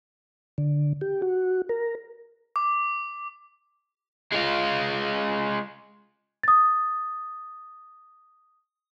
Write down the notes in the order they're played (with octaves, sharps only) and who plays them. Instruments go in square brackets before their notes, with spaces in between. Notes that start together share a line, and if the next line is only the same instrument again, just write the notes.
[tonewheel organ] D3
G4
F#4
A#4
[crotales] D6
[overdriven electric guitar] G#3 F4
[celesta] D#6 A6